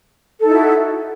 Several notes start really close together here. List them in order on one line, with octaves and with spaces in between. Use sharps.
A4 D#4 E4 F#4